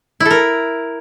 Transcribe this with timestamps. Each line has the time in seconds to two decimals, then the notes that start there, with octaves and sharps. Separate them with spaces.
0.20 E4
0.25 A4
0.30 A#4